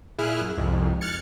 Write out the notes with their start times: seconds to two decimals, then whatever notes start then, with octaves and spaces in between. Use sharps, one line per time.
0.18 A#2 E4 G#4 F6 F#6
0.41 F#2
0.57 C2 F2 G#2
1.01 F6 F#6 G#6 A6 C#7